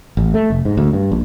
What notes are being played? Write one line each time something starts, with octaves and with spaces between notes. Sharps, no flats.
A1
A3
F1
G#2
D2
G2
A#1